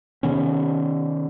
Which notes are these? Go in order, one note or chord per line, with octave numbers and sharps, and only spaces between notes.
C3 D#3 B3 C#4